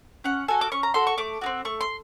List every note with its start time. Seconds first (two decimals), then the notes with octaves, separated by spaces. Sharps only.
0.24 C#4 F#5
0.48 F#4 A4 G#5
0.61 D6
0.72 C#4 C#6
0.83 A#5
0.94 F#4 A4 C6
1.07 C#6
1.18 A3 D6
1.41 D#4 F#4
1.46 C4
1.65 A3 C#6
1.81 C6